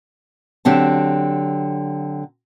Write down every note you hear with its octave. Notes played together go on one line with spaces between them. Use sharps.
D3 F#3 C4 G4 A5